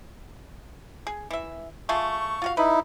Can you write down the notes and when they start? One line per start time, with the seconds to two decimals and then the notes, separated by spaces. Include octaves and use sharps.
1.07 G#4
1.31 E3 E5
1.89 A3 F4 G#4 C#6
2.42 F4 F#4 F5
2.57 D#4 E4 B4